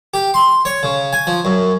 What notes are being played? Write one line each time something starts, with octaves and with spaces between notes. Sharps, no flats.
G4
C6
C#5
C#3
G#5
F3
F#2